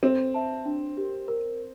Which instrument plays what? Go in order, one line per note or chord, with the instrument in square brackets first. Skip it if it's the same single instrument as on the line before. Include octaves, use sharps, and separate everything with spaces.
[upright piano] C4 [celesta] A4
[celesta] E5 A5
D4
G4 A#4
A#4